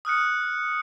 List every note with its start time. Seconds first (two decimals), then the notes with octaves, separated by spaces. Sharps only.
0.05 D#6 F6 F#6 C#7